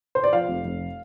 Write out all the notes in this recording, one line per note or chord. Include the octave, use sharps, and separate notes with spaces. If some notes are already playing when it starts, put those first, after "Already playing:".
C5
D5
F3 F5
F1
F1